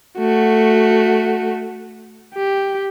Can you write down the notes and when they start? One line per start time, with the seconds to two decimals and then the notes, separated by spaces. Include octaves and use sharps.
0.18 A3 F#4
2.34 G4